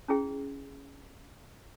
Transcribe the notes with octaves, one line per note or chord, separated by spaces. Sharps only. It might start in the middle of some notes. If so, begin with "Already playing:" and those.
C#4 E4 G#4 G5